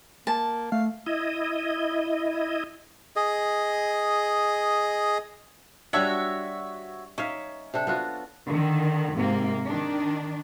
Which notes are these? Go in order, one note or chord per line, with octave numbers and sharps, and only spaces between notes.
A#3 A5
A3 F5
E4 D#5
G#4 D#5
G3 D4 F#4 C#5 E5
C#4 D#4 E5 F5
C3 D4 A4
B3 F4 F#4
D3 D#3
G#2 C3 A#3
D#3 D4